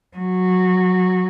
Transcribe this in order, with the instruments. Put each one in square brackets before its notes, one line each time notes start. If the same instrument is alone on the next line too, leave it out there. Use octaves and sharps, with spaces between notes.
[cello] F#3